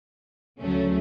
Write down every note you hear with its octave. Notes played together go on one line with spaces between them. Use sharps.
D2 C#3 F#3 A3 C#4